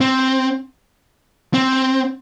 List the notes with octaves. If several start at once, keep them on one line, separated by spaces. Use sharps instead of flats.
C4
C4